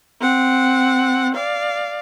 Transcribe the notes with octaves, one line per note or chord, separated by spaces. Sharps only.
C4 F#5
D5 F5